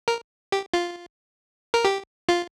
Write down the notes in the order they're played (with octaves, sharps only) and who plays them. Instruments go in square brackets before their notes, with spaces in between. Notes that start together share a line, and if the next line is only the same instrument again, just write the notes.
[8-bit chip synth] A#4
G4
F4
A#4
G4
F4